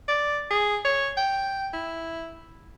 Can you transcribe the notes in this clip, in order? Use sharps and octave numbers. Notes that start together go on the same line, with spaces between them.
D5
G#4
C#5
G5
E4